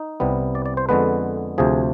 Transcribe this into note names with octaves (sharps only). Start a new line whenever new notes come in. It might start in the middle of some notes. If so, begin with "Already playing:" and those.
Already playing: D#4
C2 C3 G3 B3
D5
D5
C5
F2 D3 G#3 B3 B4
D2 C3 F3 G#4